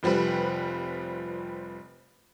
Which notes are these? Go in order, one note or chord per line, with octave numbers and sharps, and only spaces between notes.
F1 F3 G3 C4 B4